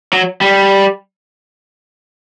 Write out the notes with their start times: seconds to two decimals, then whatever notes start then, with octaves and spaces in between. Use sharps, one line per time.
0.13 F#3
0.41 G3